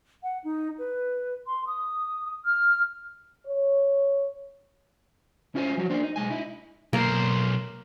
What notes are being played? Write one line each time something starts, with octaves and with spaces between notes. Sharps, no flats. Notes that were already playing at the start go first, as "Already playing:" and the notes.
F#5
D#4
B4
C6
D#6
F6
C#5
C#4 E4 F4 C5 G#5
F3 F#3 F#4
A#3 D4 C5
D#4
B1 E2 G#3 G#5
D#4 E4
B1 A#3 C5